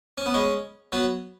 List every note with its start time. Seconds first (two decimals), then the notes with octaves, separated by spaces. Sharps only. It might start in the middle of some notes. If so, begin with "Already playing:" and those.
0.18 C#4
0.26 B3
0.34 G#3 C#4
0.92 F#3 B3